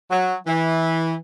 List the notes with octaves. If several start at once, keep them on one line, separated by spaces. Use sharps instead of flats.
F#3
E3